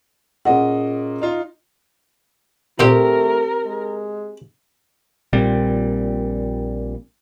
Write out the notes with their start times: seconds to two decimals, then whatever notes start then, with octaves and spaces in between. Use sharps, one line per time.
0.45 A#2 C#4 G#4 D#5 F#5
1.22 D#4 F4
2.79 A#2 A3 C4 G4 A#4
3.66 G#3
5.33 A#1 A#2 G3 C4